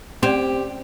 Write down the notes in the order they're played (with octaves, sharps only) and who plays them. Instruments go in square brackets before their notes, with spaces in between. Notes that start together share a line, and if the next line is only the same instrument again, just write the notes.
[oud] C4 [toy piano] C#4 C5 D5 [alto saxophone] G4